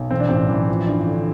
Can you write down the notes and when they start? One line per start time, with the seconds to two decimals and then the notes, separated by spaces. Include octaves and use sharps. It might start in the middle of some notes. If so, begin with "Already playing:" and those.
Already playing: B1
0.11 E3 C4
0.20 D4
0.29 A1 C4
0.49 E3
0.68 F3
0.87 G2
1.07 D3